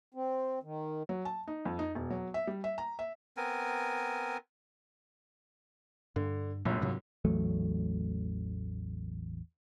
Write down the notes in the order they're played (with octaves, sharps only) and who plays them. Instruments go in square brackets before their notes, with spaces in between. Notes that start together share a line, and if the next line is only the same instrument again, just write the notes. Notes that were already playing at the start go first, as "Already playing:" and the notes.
[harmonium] C4
D#3
[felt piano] F#3
A5
D#4
F2
D#4
E1
F#3
E5
G3
E5
A#5
E5
[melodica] B3 C4 A#4 G#5
[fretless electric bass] G2 [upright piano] D3
[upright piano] G1 C#2 F#2 [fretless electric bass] A#2
[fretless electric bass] G#2 C3 F#3
[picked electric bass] A1 E2 F#3 A3